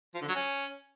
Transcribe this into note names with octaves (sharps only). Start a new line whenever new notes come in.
F3
D3
F#3
C#4